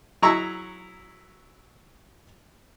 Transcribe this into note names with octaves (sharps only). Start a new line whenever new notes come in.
F#3 E4 G#4 A#5 C#6 E6